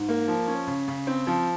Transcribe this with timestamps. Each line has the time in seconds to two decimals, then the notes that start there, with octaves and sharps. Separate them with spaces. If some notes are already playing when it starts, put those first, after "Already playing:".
Already playing: G#2
0.09 A#3
0.28 F3
0.47 C#4
0.67 C#3
0.88 C#3
1.07 C4
1.27 F3